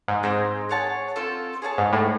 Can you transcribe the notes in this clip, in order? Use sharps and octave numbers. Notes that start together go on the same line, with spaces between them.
G#2
G#2 C4 D#4 G#4
G#4 C#5 F#5 A5
C4 F4 A4
G#4 C#5 F#5 A5
G#2
A2